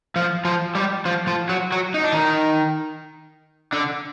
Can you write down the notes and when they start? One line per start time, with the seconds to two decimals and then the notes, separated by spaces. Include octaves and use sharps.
0.16 F3 F4
0.45 F3 F4
0.75 G3 G4
1.05 F3 F4
1.27 F3 F4
1.49 F#3 F#4
1.72 F#3 F#4
1.94 D#4
2.04 D4
2.12 D#3 D#4
3.73 D3 D4